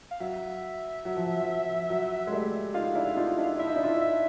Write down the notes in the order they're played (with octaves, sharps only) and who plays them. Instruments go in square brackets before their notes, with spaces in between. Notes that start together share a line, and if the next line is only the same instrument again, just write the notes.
[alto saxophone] F5
[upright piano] F#3 [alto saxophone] E5
[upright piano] F#3
F3
F3
F#3
G#3
G3 A3
[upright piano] D#4 F4 [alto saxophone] F5
[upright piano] D4 E4
D#4 F4
D4 E4
[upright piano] E4 [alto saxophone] E5
[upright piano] D#4
D4 E4
F4
D4 E4
[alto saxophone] E5